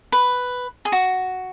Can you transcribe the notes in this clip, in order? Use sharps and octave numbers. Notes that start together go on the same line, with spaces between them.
B4
G#4
F#4